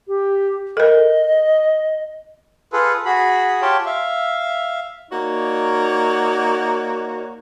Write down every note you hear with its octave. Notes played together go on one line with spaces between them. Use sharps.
G4
A4 A#4 D#5
F4 G#4 A4 B4
F#4 G#4 B5
F4 G4 C#5 G5 A5
E5 F5
A#3 D#4 F#4 C#5 D5